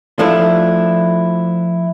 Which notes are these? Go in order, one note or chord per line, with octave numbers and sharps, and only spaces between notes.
F3 A3 D4 E4